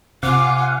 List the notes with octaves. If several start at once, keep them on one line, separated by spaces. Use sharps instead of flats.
C3 F4 F5 F#5 G#5 D6